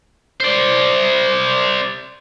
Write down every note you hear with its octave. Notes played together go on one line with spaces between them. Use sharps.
C5 D5